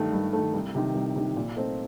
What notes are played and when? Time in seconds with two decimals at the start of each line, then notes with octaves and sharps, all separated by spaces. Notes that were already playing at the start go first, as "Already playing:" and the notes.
Already playing: G2 D#3 A3
0.13 G2
0.33 D#3 A3
0.54 C2
0.75 C3 D#3
0.95 C2
1.16 C3 D#3
1.36 A#2
1.57 A3 C4 D#4